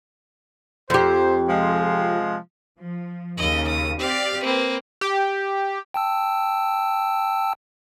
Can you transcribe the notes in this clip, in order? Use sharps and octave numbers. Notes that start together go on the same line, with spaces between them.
F2 G4 C5
C3 F3 G#3
F3
D#2 C#3 D#5
D#6
C4 G4 D5 F5
A#3 C4 B4
G4
G5 A5 E6